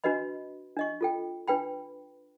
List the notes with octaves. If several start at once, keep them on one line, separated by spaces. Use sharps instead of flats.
D4 F#4 B4 D#5 B5
D4 D#5 C#6
F4 A4 G5
D4 B4 G5 B5